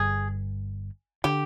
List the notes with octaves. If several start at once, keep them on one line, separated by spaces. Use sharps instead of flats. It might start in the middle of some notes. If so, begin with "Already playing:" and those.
Already playing: G1 G2 D3 G#4
D3 G4